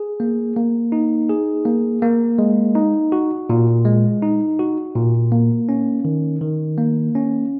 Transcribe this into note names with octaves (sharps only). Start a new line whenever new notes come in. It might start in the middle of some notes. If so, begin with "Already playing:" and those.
Already playing: G#4
A#3
A#3
D#4
G#4
A#3
A#3
G#3
D#4
F#4
A#2
G#3
D#4
F#4
A#2
A#3
C#4
D#3
D#3
A#3
C#4